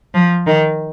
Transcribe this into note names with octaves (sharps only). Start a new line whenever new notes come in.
F3
D#3